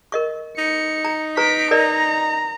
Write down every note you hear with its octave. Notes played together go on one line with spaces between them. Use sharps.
A#4 D#5 C#6
D#4 C#7
A#5
B4 A#5 C#6 B6 D7
A#4 D5 D#5 A#5